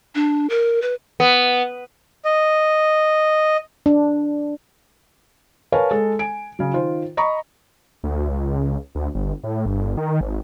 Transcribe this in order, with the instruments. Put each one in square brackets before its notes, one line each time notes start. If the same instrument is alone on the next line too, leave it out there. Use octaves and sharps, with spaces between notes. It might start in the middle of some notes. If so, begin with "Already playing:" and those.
[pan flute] D4
A#4
B4
[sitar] B3
[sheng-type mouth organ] D#5
[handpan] D4
[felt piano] A#4 B4 C#5 F5 G#5 A5
G#3 A4
G#5 D7
C#3 F#3
D#3 F4 C5
D#5 A#5 B5 C#6
[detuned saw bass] D2
C#2
D2
G1
A2
G1
D#3
G#1